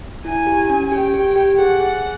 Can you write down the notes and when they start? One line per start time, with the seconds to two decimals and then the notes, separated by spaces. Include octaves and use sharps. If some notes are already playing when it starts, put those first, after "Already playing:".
0.25 E4 G#5
0.47 G4
0.70 C#4
0.91 G4 G5
1.14 G4
1.36 G4
1.58 G#4 F#5
1.80 G#4